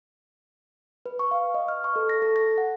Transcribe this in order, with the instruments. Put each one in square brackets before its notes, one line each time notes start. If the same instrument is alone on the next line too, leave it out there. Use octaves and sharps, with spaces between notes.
[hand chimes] B4
C#6
F5
D#5
F6
C#6
A4
A#6
A4
A#6
F#5